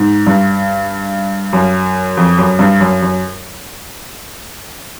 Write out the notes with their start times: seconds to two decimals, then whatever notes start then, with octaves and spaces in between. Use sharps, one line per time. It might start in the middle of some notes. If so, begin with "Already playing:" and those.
Already playing: G#2
0.27 G2
1.53 F#2
2.17 F2
2.38 F#2
2.59 G2
2.80 F#2
3.02 F#2